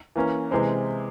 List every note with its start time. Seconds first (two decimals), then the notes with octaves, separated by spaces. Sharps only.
0.16 E3 A#3 C#4
0.51 C3 E3 G#3 C4